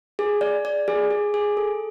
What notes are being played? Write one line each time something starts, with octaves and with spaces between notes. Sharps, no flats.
G#4
D5
D5
G#4
G#4
G#4
A4